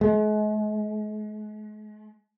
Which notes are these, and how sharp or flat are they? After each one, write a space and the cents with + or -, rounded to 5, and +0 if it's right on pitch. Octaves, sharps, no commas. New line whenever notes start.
G#3 +40